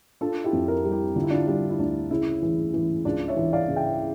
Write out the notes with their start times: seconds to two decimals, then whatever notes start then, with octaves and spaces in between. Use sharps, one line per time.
0.21 D4 F4 A4
0.44 E4 G4
0.53 F2
0.68 G4 A#4
0.85 G3
0.91 E4 G4
1.16 D3 F4
1.23 E4
1.30 D4 F4
1.47 G3 D4
1.69 E4
1.79 D2 D4
2.10 C#3 E4
2.42 E3
2.74 E3
3.05 C#2 D4 F4
3.28 C#5 E5
3.36 E3
3.53 D5 F5
3.68 C#3
3.76 E5 G5